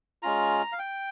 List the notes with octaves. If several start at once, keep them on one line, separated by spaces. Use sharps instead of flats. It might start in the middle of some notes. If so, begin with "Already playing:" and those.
G#3 C#4 F4 A#5
F5
G5